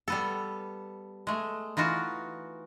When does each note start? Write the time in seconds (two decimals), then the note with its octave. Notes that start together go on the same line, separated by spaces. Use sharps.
0.08 G3 B3 A4
1.27 G#3 A3
1.77 E3 D#4 F4 F#4